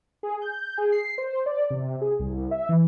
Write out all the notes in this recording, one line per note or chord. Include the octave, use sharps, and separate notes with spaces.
G#4
G6
G#4
C7
C5
D5
C3
G#4
C2
E5
E3